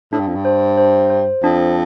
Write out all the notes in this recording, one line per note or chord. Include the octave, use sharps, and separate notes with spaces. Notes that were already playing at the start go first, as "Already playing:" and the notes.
A2 D4
G2
F2
G2
C5
C5
C5
F2 D4